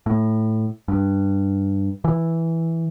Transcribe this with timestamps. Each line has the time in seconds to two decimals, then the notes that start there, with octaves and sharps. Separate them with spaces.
0.06 A2
0.88 G2
2.04 E3